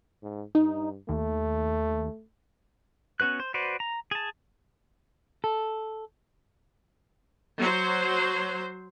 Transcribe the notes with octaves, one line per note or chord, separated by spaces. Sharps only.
G#2
G2 D#4
D#2 A3
B3 C#4 F#4 B4 F#6
C5
F#4 B4 C5 D5
A#5
G#4 A5
A4
F#3 C5